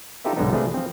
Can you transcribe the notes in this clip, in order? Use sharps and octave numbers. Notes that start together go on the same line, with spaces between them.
D#4 F4 G4 A4 B4 E5
B1 G#2 D3 F3 B3 D#4
C3 F3 A3 D4 G#4 B4
F3 C4